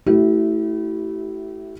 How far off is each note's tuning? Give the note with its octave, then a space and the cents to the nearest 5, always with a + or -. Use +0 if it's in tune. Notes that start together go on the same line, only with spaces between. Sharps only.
A3 +0 E4 -10 G4 -45